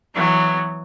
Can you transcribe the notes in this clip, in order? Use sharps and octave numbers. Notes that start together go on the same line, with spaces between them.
E3 F#3 B3